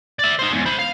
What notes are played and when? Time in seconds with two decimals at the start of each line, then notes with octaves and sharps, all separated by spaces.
0.19 D5 E5
0.39 D#4 C5
0.52 E2 G#2
0.65 C5 B5
0.78 F5